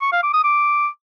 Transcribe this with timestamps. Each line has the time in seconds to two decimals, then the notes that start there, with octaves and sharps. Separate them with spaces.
0.01 C#6
0.12 F5
0.23 D6
0.33 D#6
0.44 D6